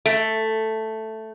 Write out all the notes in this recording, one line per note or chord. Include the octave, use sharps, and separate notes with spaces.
A3